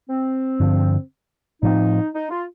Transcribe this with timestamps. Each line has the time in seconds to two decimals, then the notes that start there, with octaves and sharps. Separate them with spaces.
0.09 C4
0.60 G2 D3 F3
1.62 A2 F3 C4 D#4
2.14 D#4
2.31 F4